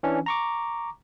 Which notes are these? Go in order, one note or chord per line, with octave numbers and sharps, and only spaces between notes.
E3 C#4 D4
A#5 C#6 D6